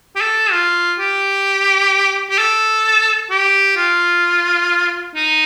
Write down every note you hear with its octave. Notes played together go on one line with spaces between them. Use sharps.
G4
A4
F4
G4
G4
A4
G4
F4
D#4